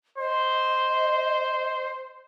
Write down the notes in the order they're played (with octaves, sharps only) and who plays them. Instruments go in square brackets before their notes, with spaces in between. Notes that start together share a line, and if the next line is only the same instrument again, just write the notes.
[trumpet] C5 [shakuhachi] D#5